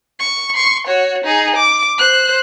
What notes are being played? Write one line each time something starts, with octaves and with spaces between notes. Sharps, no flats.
C#6
C6 C#6
F#4 C#5
D#4 G#4
D6
C5 F#6